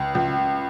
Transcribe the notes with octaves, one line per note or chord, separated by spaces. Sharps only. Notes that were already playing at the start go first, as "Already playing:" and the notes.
Already playing: C#2
C#2